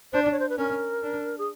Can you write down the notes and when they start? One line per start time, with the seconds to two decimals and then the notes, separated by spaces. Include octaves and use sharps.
0.13 D4 C5
0.22 D5
0.31 C#5
0.39 C5
0.49 B4
0.58 C#4 A#4
1.03 D4
1.38 G#4